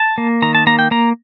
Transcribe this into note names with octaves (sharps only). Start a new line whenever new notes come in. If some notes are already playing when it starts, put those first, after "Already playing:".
Already playing: A5
A#3
D#3 A#5
A5
A#3 A#5
G5
A#3 A#5